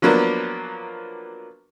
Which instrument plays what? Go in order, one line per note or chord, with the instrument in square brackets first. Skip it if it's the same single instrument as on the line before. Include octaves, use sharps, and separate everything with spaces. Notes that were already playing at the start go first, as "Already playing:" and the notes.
[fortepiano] F3 F#3 A#3 B3 D4